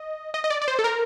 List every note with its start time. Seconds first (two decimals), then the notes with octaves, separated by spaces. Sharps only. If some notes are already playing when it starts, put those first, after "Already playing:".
Already playing: D#5
0.34 D#5
0.44 D#5
0.50 D5
0.62 D5
0.68 C5
0.79 A4
0.84 A#4